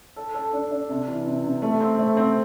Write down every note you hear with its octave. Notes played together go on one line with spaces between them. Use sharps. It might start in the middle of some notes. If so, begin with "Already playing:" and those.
A4
A4
D4
D4
C3
E3
C3
C3
A3
C4
A3
C4